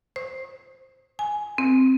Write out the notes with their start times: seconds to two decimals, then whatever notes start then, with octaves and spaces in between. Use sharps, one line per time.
0.16 C5
1.19 G#5
1.58 C4